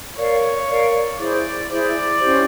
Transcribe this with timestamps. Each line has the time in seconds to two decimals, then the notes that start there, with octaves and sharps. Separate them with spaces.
0.18 A#4 C#5 D5 F5
0.69 A#4 D5 F5
1.18 E4 G#4 C5 D5
1.69 E4 G#4 C5 D5
2.19 C#4 E4 G4 C5